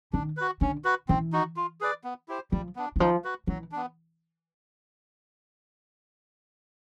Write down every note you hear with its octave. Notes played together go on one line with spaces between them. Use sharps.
D#3 D4
F#4 B4
D3 C#4
F#4 B4
E3 C4
D#4 F#4
F4
G#4 B4 D5
B3
E4 G4 C5
F3 G3
B3 D4
E3
F3 D#4
F#4 B4
E3 F#3
B3 D4